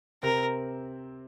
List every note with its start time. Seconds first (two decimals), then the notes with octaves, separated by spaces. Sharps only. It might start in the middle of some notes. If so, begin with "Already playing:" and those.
0.23 C3 C4 A#4